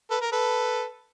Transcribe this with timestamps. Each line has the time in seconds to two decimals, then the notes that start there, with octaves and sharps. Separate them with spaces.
0.10 A4 B4
0.21 A#4
0.32 A4 B4